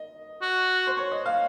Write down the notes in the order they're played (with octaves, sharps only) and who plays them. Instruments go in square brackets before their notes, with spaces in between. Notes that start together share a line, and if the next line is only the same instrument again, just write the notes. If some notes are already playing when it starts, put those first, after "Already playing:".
Already playing: [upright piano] D#5
[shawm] F#4
[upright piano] C5
C#5
D#5
F5